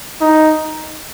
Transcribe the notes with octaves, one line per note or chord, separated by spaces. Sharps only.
D#4